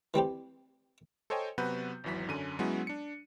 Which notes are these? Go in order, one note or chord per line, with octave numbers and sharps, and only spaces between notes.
E3 G3 C4 G4
A4 C5 C#5 D#5 G5 G#5
C3 F#3 B3 F#4 B4 G6
G#1 E2 E3 F#3 B6
F#2 D3 C#4 D#7
F#3 G#3 B3 C#4 E4 F#4
D4 C#7